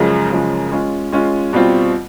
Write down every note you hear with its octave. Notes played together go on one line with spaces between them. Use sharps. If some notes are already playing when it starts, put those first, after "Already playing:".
Already playing: F#2 C#3 F3 G#3
F#2 C#3 F3 G#3
G#3 C#4 F4
G#3 C#4 F4
B2 G3 C4 F4